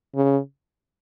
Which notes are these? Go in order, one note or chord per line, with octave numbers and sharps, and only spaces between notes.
C#3